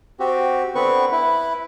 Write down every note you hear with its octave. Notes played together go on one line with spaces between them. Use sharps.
C4 F#4 G4
D3 B3 C4 B4 C#6
E4 B4